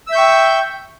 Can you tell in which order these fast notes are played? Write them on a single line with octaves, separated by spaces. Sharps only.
E6 E5 G6 C#6 G5